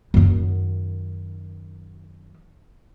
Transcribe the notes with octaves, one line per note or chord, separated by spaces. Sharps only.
F#2 D#3